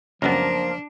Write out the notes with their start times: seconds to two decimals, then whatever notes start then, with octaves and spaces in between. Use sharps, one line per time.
0.22 C#2 F#2 F3 A#3 B3 D4 A#4